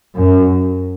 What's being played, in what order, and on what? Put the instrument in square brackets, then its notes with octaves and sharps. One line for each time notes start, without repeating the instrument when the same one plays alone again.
[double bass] F#2